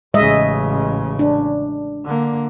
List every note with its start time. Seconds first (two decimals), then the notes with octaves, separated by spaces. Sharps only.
0.14 A1 C#3 G#3 D#5 E5
1.19 D4
2.05 D3 A#3